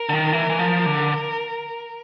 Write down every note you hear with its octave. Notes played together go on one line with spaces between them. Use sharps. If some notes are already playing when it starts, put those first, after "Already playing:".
Already playing: A#4
D3
D#3
E3
E3
F3
D3